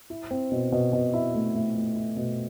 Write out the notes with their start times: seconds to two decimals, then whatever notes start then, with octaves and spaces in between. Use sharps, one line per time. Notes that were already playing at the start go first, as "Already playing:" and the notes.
0.10 E4
0.31 C4
0.52 B2
0.72 B2
0.93 B2
1.14 E4
1.35 A3
1.55 A3
1.76 A3
1.97 E4
2.17 B2